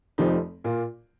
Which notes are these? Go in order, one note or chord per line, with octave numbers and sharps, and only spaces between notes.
F1 F2 F3 D#4 G4
A#2 A#3 F4